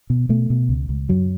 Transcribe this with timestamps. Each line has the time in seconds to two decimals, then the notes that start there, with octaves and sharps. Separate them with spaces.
0.10 B2
0.29 B2 A3
0.50 B2
0.69 C#2
0.89 C#2
1.09 F#2 F#3